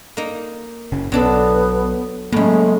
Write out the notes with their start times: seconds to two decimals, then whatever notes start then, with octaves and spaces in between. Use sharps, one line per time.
0.17 A#3 D#4
0.92 F#1 C#3
1.12 B1 B2 F#3 B3 D4 A4
2.32 A2 C#3 F#3 G#3 A#3